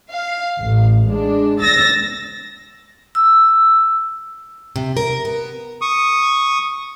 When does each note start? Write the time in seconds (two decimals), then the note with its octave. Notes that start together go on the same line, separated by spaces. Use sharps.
0.10 F5
0.59 A1
1.08 G#3 D4
1.60 E6 A6 A#6
3.15 E6
4.76 C3
4.97 A#4
5.25 B3
5.81 C#6 D#6